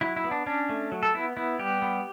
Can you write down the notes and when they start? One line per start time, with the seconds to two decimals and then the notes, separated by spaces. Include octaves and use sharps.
0.01 F#3 E4
0.16 E4
0.24 B3
0.31 D4
0.46 C#4 D4
0.69 A3
0.92 F#3
1.03 A4
1.14 B3 E4
1.37 B3 E4
1.59 G3 G4
1.82 B3